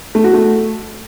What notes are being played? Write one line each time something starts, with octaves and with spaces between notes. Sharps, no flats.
A3
F#4
A3